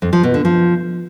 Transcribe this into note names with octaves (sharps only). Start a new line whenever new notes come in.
F2
F3
B2
D3
F3